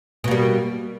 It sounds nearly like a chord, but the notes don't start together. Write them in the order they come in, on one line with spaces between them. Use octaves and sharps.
B2 A#3 G3